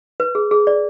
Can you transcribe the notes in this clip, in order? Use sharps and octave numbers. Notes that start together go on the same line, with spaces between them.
B4
G#4
G#4
D5